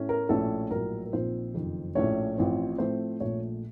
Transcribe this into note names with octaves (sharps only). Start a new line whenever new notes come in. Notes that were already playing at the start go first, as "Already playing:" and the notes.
Already playing: A2 A3 C#4
A#4
A#1 A2 A3 C#4 A4
A#1 A2 F#3 A#4
A#4
A#1 A#2 F3 C4 D#4 C5
F#1 F2 D#3
A#1 A2 A3 C#4 C#5
A1 A2 F3 C4
A2 F3 A3 C4 C5
A#1 A#2 A3 C#5